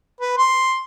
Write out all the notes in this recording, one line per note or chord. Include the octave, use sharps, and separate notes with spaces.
B4
C6